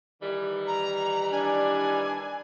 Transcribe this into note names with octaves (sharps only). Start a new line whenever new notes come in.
D#3 E3 G3
A#5
D4 G#5